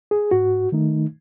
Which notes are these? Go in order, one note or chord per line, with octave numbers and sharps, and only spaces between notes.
G#4
G#2 F#4
D#3 A3 D#4